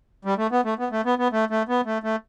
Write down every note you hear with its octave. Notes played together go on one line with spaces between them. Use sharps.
G3
A3
B3
A3
B3
A3
B3
B3
A3
A3
B3
A3
A3